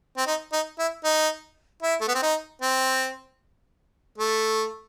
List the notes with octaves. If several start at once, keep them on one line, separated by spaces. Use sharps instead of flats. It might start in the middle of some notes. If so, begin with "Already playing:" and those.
C4
D#4
D#4
E4
D#4
E4
A3
B3
C4
D#4
C4
A3